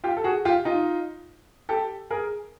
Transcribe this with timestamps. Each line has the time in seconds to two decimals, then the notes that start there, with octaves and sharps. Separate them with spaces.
0.04 F4 G4
0.17 A4
0.24 F#4 G#4
0.45 F4 G4
0.65 D#4 F4
1.69 G4 A4
2.10 G#4 A#4